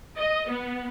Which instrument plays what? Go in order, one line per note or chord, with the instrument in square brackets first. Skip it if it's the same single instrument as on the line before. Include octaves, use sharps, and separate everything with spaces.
[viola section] D#5
B3